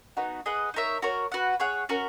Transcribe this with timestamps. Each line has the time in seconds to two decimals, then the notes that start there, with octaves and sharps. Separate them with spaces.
0.17 B3 D#4 F#4
0.46 G#4 B4 D#5 F#5
0.74 D#4 A#4 C#5 E5
1.02 F#4 A#4 C#5
1.32 F#4 B4 F#5
1.60 G#4 C#5 F#5
1.89 C#4 F#4 A#4